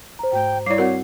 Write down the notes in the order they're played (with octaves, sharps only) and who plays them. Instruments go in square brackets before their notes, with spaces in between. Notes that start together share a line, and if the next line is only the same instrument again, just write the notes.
[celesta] C5 A#5
[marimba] G#2 A3 [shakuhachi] G5
[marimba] G3 E4 [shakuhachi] C#5 [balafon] D5 D6 [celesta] C7
[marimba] G3 C4 F#4 [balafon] A#4 F#5